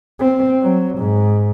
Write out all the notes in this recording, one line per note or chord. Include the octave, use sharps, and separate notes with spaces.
C4
F#3
G#2